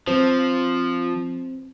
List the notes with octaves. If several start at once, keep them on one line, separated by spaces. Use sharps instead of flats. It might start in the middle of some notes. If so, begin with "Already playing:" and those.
F3 C4 C5